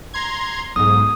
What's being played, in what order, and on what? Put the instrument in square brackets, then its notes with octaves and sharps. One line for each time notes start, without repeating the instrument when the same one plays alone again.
[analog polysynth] A#5 C6 G#6
[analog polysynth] B1 G#2 [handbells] D#6